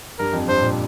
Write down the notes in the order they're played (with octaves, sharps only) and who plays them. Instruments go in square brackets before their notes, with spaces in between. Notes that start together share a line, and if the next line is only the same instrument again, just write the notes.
[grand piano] G2 [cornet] A#4
[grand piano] F2
[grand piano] G2 [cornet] C5
[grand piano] A#2